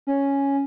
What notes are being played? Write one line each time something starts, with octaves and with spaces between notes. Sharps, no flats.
C#4